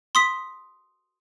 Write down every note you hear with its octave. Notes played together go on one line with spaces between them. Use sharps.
C6 D#6 B6